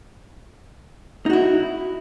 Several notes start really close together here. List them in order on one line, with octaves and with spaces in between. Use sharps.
D#4 F#4 E4